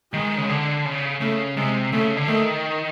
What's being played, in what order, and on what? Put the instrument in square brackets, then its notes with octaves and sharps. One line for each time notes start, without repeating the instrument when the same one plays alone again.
[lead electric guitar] D#3 [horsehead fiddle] G#3
[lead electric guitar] C#3
D3
C#3
[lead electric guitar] C#3 [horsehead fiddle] A3
[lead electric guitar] C3 [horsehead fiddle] G#3
[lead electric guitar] C#3 [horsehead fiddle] A3
[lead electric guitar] D3
[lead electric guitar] D#3 [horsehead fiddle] A3